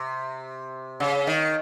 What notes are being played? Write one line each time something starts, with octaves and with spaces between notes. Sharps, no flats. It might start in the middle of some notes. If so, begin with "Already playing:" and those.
Already playing: C3
C#3
D#3